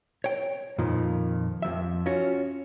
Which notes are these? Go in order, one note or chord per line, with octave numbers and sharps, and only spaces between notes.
C#5 G5
F2 A#2 D#3 F3
F2 F3 E5
C#4 F4 F#4